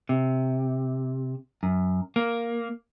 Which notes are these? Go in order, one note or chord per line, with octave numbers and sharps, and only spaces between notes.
C3
F#2
A#3